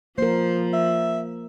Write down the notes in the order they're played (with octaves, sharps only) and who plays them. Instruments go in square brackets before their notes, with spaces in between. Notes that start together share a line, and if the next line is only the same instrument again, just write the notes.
[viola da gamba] F3 [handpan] A#3 A#4 [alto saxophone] C5
[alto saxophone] E5